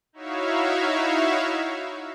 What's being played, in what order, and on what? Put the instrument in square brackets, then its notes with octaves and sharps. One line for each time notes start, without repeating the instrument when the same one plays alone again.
[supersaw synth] D#4 E4 F#4 C#5 E5 F5